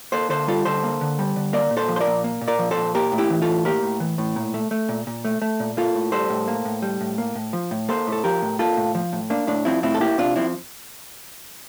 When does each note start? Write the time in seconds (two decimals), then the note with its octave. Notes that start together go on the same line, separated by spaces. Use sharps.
0.12 A#3 A4 C5
0.29 D3 A4 C5
0.48 G3 F4 A4
0.65 D3 A4 C5
0.83 A#3
1.01 D3
1.19 G3
1.36 D3
1.53 A#3 A#4 D5
1.71 A#2
1.77 A4 C5
1.89 F3
1.96 C5
2.01 A#4 D5
2.07 A#2
2.24 A#3
2.41 A#2
2.48 A#4 D5
2.59 F3
2.71 A4 C5
2.77 A#2
2.95 A#3 G4 A#4
3.12 A2
3.18 E4 G4
3.30 E3
3.42 F4 A4
3.48 A2
3.65 A#3 G4 A#4
3.83 A2
4.00 E3
4.18 A2
4.36 A#2
4.54 A3
4.71 A3
4.89 A#2
5.07 A#2
5.25 A3
5.42 A3
5.60 A#2
5.77 A#3 F4 A4
5.95 A2
6.12 G3 A4 C5
6.30 A2
6.48 A#3
6.65 A2
6.82 G3
7.01 A2
7.18 A#3
7.35 A2
7.53 F3
7.71 A2
7.89 A#3 A4 C5
8.07 A2
8.12 A4
8.24 F3 G4 A#4
8.42 A2
8.59 A#3 F4 A4
8.77 A2
8.95 F3
9.13 A2
9.30 A#3 D4
9.47 A2 D4
9.65 F3 C4 E4
9.83 A2 C4 E4
9.94 A4
10.01 A#3 E4 G4
10.18 C3 D4 F4
10.36 F3 C4 E4